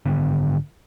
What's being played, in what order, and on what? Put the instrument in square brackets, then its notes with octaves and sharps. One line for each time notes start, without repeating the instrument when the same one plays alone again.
[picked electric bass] G#1 D3 B3